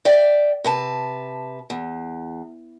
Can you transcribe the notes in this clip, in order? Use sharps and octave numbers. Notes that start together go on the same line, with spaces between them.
D5 E5 G5
C3 B4 A5
E2